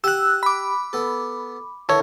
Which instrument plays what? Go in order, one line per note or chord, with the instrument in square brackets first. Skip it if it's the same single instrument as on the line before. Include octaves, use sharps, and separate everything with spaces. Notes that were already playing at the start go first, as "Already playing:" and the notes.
[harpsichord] G4 F#5 G#5 [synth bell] E6 F#6
[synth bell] B5 D6
[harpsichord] B3 A4
[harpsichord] D3 E3 A#4 [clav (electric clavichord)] A4 C#5